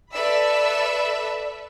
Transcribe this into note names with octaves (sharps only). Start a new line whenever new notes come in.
A4 B4 D5 E5 B5 E6